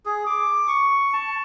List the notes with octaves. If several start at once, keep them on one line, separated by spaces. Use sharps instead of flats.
G#4
D6
C#6
A5